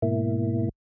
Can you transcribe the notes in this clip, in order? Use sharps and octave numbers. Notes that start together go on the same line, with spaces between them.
G#2 B2 A#3 E4